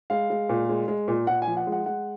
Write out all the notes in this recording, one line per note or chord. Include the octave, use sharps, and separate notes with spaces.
G#3 F5
G#3
A#2
G#3
G#3
A#2
A#2 F#5
G#5
F3
F#5
G#3
F#5
G#3 F#5